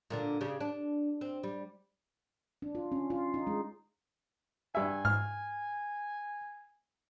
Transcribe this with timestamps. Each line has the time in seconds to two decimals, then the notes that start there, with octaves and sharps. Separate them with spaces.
0.10 A#2 D3 D4
0.41 C#3 D4 G4
0.60 D4
1.21 C4
1.43 G3
2.62 D4
2.75 F4
2.92 C#4
3.10 F4
3.34 D#4
3.47 G#3
4.75 G2 E5 G#5
5.05 G#2 F6